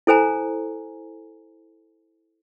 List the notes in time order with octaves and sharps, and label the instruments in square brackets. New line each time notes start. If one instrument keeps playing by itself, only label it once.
[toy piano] E4 A4 C5 G#5 A#5